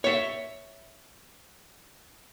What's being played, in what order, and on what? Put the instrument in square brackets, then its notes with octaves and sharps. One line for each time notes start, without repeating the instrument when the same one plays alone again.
[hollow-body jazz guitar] C#5 E5